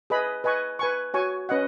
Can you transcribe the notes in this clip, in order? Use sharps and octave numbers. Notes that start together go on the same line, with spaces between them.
G#4 B4 D#5 B5
B4 D#5 G#5 C#6
B4 G#5 C#6
F#4 C#5 G#5 C#6
C#4 B4 D#5 F#5